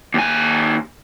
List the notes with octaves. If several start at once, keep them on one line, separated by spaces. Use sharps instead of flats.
D#2 G#5